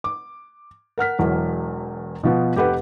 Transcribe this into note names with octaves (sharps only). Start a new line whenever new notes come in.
D6
A#4 F#5 F6 B6
E1 E2 F#3
B2 F3 B3
F1 G4 A4 B4 F#5